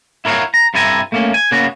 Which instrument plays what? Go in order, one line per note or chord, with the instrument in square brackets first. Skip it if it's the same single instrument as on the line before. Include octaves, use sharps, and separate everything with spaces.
[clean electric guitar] E4 A#4 C#5 F5 F#5
A#5
G2 C3 E4 A4 G#5 A#5
A3 A#3 C#4
G#5
C#3 A#3 B3 C#4 F#4